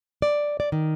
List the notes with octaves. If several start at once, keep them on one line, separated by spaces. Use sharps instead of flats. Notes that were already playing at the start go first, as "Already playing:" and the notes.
D5
D5
D#3